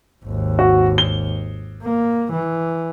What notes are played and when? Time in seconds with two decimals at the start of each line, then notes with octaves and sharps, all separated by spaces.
0.24 G#1 D#2
0.59 F#4
0.98 G7
1.83 A#3
2.32 E3